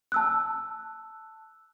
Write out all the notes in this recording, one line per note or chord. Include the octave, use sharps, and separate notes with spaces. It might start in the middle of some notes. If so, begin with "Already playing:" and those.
A5 E6 F#6